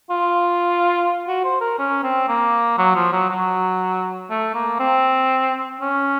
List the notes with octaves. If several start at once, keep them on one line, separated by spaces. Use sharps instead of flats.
F4
F#4
C5
A#4
C#4
C4
A#3
F#3
F3
F#3
F#3
A3
A#3
C4
C#4